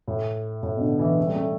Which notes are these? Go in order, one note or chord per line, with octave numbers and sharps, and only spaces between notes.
A2
A2
B2
D3
E3
A3
G3
A3